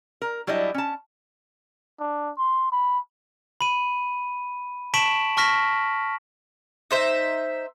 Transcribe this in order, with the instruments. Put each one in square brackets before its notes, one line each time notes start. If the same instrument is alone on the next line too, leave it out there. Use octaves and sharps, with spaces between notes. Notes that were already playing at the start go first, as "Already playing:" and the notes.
[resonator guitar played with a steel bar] A#4
F#3 G3 D4 E4 D#5
C#4 A5
[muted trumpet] D4
C6
B5
[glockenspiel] B5 D#7
A5 C#6 B6 D7 E7 F#7
A5 C#6 F6 A#6 B6
[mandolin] D#4 C5 E5